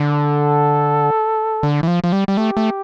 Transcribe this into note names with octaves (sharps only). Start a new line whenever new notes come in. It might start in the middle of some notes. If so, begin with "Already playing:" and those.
Already playing: D3
A4
D3
E3
F3
F3
G3
G3
A3 G4
A3